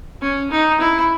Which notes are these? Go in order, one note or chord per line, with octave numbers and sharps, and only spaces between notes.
C#4
D#4
E4